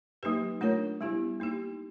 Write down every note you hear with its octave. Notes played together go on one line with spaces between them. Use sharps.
F#3 A#3 D#4 G4 B4
A3 D4 F4 A#4 C#5
G3 B3 E4 G4
A#3 D#4 G4